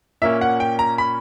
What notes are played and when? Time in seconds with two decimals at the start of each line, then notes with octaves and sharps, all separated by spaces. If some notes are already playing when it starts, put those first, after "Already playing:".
0.22 A#2 A#3 C#4 E5
0.41 F#5
0.60 G5
0.79 A#5
0.98 B5